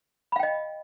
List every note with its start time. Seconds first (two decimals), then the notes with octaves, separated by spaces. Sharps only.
0.32 B5
0.36 F5
0.39 G5
0.43 D#5